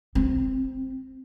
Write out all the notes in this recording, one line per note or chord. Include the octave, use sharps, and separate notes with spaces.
C4